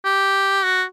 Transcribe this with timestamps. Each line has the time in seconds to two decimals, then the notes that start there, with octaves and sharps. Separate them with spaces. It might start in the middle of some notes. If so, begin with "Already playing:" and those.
0.05 G4
0.63 F#4